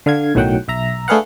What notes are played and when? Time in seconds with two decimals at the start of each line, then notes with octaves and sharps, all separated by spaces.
0.06 D3 F5 G#6
0.35 B1 A2 D#3 F#3 F#5 G5
0.68 B1 E5 A#5
1.08 A3 D4 G#4 B4 F5 F#5